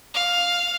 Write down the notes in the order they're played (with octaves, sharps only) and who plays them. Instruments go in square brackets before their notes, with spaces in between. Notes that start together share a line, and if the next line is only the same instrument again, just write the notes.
[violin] F5